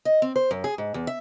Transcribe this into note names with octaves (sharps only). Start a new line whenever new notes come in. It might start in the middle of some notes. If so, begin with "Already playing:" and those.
D#5
C4
C5
F#2
G#4
G#2
E2
E5